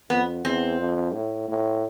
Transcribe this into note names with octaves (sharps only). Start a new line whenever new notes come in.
F2 B3
E2 C4
F2
A2
A2